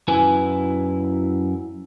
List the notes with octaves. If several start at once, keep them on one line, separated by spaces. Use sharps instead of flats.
F#2 E4 B4 G#5